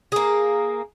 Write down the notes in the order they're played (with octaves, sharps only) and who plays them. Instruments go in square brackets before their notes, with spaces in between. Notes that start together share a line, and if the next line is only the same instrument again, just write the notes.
[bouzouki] A#3 G#4